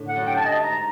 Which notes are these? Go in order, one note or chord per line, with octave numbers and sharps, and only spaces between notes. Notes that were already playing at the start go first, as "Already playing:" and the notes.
Already playing: A2 D3
F#5
F#2
G2 G5
A5
D#5
A5
G#2 A#5